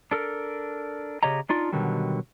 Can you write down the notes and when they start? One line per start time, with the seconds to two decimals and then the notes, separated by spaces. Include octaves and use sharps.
0.11 D4 A4 A#4
1.23 C#3 G4 C#5 D#5 A#5
1.49 D4 D#4 F4 D5
1.72 B2 D3 D#3 F#3 G3